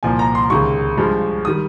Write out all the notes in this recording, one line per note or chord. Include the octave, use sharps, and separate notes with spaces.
C2 A#2 F3 G#5
A#5
C6
C#2 C3 D#3 G#3 C#6
G2 F3 G#3
D#3 G3 D#6